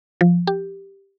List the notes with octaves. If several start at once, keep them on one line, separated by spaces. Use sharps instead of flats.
F3
G4